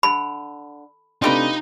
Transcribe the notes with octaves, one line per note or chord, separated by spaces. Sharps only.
D3 B5
C3 A3 D4 D#4 F4 G4 B4